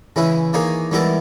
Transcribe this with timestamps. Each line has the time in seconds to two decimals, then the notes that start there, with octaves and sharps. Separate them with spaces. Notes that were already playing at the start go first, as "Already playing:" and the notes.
0.16 C#3 E3 G#3 C#4 E4
0.53 D#3 A#3 D#4 G#4 C#5
0.91 G#2 E3 G3 B3 E4 A#4